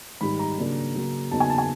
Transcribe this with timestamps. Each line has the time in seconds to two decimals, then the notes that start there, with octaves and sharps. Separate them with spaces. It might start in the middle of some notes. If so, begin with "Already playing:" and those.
0.21 G#2 D#3 G3 B5
0.39 A#5
0.58 C#3 F#3 A#3 D4
0.94 C#3 F#3 A#3
1.31 E2 C#3 F#3 A#3 D#4 A5
1.40 G#5
1.50 A5
1.58 G#5